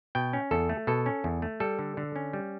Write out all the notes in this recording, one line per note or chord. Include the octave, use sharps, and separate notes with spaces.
B2 G5
C#4
E2 A4
A3
B2 A4
C#4
E2
A3
G3 A4
D3
D3
C#4
G3